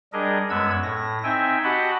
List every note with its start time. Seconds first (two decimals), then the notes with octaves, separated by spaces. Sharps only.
0.13 G3 D4 G#4 A#4 D#5
0.50 F#2 G#3 B3 F#5 E6 G#6
0.83 A2 A#6
1.23 C4 D#4 E5 G5 G#5
1.64 F#4 G4 D#5 F#5 A5 B5